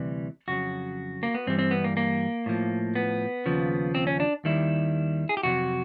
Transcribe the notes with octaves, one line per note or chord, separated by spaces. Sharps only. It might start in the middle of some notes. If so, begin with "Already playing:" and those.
Already playing: D2 C3 E3 G3
F2 C#3 F#3 F#4
A#3
B3
G2 E3 G3 C4
C4
B3
A#3
A#3
A2 F3
B3
D#2 C#3 F3
C4
C#4
D4
D#2 D#3 G3 E4
G#4
G4
F2 C3 D#3 F#3 F#4